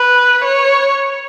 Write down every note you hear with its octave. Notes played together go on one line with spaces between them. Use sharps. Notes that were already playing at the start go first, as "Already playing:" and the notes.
Already playing: B4
C#5